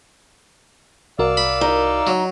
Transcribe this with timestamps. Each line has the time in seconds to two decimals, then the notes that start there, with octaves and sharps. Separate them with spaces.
1.19 C2 F#4 A#4 D5 F5 E6
1.37 B5
1.61 D#4
2.07 F#3